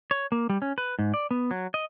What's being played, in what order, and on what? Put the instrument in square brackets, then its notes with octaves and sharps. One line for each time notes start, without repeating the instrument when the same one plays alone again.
[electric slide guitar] C#5
A#3
G3
C#4
B4
G#2
D5
B3
F#3
D#5